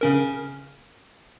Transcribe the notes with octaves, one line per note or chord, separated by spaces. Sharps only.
C#3 C#4 A#4